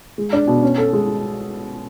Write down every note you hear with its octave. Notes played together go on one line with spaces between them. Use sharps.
G#3
D4
B2
C#4
A4
G#3